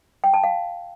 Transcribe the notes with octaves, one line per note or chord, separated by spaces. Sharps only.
G5
A5
F5